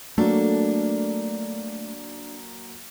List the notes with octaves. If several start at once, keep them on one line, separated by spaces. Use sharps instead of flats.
F#3 A3 A#3 D4 A4